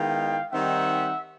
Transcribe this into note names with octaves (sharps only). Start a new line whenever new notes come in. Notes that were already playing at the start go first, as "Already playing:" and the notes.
Already playing: D#3 G#3 B3 E4 F5 G5
D#3 G3 C4 D#4 E5 F#5